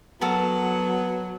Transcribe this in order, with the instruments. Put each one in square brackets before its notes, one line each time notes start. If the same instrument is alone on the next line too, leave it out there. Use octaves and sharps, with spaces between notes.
[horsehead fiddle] F#3 [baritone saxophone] B3 [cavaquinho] F#4 A4 A#4